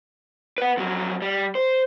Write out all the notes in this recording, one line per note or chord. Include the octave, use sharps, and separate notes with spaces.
B4 F#5
F2 F#3
G3
C5